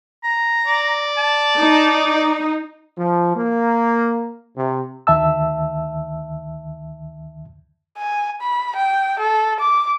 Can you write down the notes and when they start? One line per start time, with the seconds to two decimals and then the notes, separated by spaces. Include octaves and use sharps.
0.24 A#5
0.66 D5
1.17 A5
1.59 D#4
2.98 F3
3.36 A#3
4.57 C3
5.07 D2 D#3 E5 A5 E6
7.98 G#5
8.41 B5
8.76 G5
9.19 A4
9.60 D6